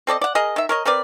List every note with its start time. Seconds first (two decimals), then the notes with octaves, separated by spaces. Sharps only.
0.07 C4 A4 D5 D#5
0.21 D5 F#5
0.35 G#4 A#4 D#5
0.56 D#3 E5
0.69 A#4 C#5 D#5
0.85 C4 A#4 B4 D5